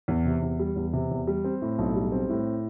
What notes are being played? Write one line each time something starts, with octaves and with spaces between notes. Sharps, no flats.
E2
C3
E2
G3
E2
C3
E2
G3
C4
A2
B1
G3
C4
A2